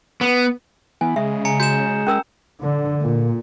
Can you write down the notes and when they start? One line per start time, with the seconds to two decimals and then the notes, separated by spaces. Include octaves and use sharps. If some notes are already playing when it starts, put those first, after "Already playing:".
0.21 B3
1.01 E3 B3 G#5
1.16 C#3 G#3 E5
1.45 G#5 A#5 C#7
1.60 F#4 G6 E7
2.07 C#4 A#4 E6
2.62 D3
3.02 A#2